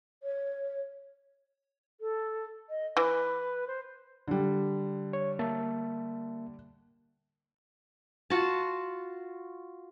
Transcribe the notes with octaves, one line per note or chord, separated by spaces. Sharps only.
C#5
A4
D#5
E3 B4
C5
D3 G3
C#5
A#3 E5 A5
F4 F#4 A5